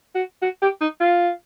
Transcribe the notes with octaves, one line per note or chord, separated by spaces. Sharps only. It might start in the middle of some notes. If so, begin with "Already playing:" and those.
F#4
F#4
G4
D#4
F4